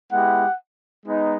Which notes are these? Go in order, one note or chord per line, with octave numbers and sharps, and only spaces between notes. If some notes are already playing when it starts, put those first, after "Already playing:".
G#3 B3 E4 G4 F#5
G#3 B3 D#4